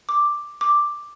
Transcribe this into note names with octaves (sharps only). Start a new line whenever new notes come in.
D6
D6